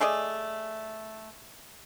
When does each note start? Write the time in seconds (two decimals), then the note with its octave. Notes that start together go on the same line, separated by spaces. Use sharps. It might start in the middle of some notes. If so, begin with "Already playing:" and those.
0.01 A3 G#4 D5 D#5